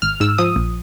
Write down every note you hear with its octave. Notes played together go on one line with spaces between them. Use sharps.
G#1 F6
G#2 E6
F3 D#6
A#1